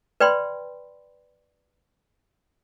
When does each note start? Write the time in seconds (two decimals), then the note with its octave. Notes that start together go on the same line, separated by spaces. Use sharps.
0.20 B4 D5 G5 B5 C6